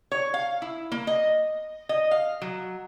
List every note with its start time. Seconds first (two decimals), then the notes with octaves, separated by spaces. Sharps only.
0.12 C#5
0.34 F5
0.62 E4
0.92 A#3
1.07 D#5
1.89 D#5
2.11 F5
2.42 F#3